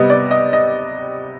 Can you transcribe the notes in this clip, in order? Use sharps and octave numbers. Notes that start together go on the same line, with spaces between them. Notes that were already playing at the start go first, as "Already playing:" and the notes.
Already playing: C3 G3 B3 D#5
D5
D#5
D#5